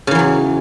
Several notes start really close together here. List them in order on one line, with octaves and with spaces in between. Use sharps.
C#3 E3 F#3 E2